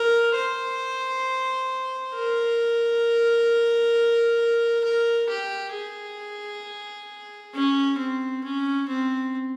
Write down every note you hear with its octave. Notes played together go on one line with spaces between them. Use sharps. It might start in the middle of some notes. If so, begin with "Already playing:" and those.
Already playing: A#4
C5
A#4
A#4
G4
G#4
C#4
C4
C#4
C4